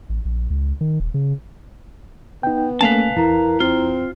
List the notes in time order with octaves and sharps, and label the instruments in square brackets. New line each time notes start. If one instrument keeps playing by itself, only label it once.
[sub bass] A1
A#1
C#2
D#3
D#1
C#3
[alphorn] B3 [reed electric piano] D#4 G5
[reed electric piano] A3 A#3 C#4 [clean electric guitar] B4 F5 A5 [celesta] G#5
[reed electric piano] E2 [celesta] E4 A#5 [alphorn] A#4
[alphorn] C4 [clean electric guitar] F4